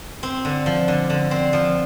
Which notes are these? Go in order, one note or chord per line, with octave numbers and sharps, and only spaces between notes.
C4
D3
F3
D3
D3
C4
F3